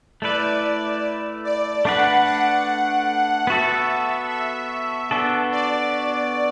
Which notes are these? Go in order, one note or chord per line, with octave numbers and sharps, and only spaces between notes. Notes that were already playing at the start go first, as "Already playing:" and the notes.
A3 E4 B4 D5
D5
A3 D4 B4 F#5
F#5
B3 F#4 A4 E5
E5
B3 D4 F#4 A4
D5